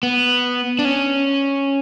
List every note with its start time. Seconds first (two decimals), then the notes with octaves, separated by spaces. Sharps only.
0.03 B3
0.79 D4
0.85 C#4